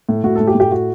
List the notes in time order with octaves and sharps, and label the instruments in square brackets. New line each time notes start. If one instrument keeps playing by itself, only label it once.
[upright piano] A2
A2 F#4
A2 A4
G4
A2
G4
F#4